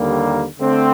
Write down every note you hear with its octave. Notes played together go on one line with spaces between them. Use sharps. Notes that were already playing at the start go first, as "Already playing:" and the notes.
Already playing: D#2 D3 G3 A#3
D3 A3 C4